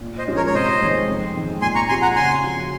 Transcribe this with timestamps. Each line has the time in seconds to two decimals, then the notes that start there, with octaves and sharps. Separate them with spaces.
0.01 A#2
0.18 C5 D#5
0.27 F3 G#3 C#4 F4
0.36 A#4 C#5
0.47 C#5
0.54 C3 C5 D#5
0.81 D#3 G#3
1.08 F2
1.35 D#3 G#3 C4
1.62 A#2 G#5 C6
1.75 A#5 C#6
1.89 F3 C4 F4 G#4 G#5 C6
2.02 F#5 A#5
2.15 C#3 G#5 C6
2.42 F3 C4 F#4